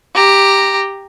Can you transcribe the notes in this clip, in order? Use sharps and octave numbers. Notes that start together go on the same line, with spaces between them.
G4 A#5